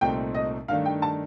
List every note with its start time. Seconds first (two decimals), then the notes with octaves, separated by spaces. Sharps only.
0.01 C2 A#2 A3 C4 D#4 G5
0.34 D#5
0.68 G2 D#3 A3 D4 F5
0.85 G5
1.02 A5